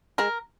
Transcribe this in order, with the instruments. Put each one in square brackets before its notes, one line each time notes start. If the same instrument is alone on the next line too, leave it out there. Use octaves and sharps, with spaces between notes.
[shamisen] G#3 [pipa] A#4